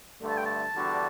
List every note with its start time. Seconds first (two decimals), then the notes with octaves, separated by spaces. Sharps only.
0.20 G2 D3 A3
0.29 A5
0.37 G5
0.46 A5
0.75 E2 D3 G3 D4 F#4